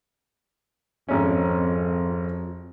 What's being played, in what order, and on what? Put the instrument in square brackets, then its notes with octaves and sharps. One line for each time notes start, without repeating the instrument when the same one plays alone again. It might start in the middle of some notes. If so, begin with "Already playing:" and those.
[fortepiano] G#1 C#4 [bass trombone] F2